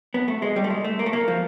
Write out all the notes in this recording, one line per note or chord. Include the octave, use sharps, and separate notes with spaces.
B3
A3
G#3
G3
A3
G#3
A3
A#3
A3
A#3
F3